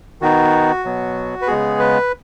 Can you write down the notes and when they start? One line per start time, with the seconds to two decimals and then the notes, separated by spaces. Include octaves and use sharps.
0.21 D#3 B3 D#4 F#4
0.85 B2 F#3 B3
1.42 B4
1.47 C#3 G#3 B3 G#4
1.79 B4